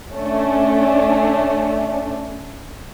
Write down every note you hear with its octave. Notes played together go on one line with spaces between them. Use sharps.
A3 C#4 D4